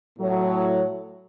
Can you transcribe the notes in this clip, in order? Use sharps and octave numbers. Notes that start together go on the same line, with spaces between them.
A2 F#3